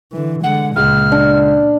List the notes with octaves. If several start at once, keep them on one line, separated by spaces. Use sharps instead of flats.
D3 E3
D3 G#3 F#5
C#2 A#2 F6
D4